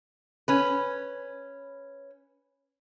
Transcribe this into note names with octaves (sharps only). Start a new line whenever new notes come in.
C#4 B4